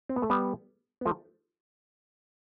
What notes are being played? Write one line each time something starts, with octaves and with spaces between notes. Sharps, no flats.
C4
B3
A3
G3 B3
B3
F3 A3